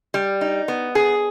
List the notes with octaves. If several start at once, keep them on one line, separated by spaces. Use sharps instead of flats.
G3
D#4
B3
G#4